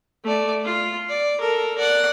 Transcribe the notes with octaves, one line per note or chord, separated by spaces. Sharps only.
A3 D5
F4
D5
A4 A#4
D5 F#5